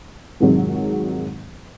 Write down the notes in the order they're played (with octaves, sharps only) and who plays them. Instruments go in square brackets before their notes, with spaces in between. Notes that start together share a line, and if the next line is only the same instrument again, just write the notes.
[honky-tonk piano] F2 G#2 C3 D#3 F#3 G#3